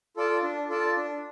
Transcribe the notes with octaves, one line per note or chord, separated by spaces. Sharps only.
F4 A4 D5 A5
D4
F4 A4 D5 A5
D4